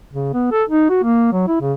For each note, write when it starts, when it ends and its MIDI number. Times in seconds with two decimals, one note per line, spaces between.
0.13 0.30 49
0.34 0.47 59
0.51 0.63 69
0.69 0.87 63
0.89 1.01 66
1.03 1.31 58
1.32 1.48 54
1.48 1.58 64
1.61 1.73 49